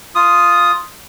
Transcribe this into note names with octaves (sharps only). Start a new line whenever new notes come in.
F4 D#6